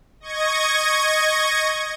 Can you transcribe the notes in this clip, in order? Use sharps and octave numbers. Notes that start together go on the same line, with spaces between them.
D#5 C#6 G#6 A#6